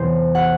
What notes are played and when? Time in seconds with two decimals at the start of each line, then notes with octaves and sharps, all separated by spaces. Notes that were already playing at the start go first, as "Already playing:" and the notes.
Already playing: E2 C3 E3 C5
0.35 F#5